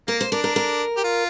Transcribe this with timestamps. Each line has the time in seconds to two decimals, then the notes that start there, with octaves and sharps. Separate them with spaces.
0.08 A#3 A#4
0.21 C5
0.32 D4 A#4
0.44 A#4
0.56 A#4
0.97 G4
1.04 F4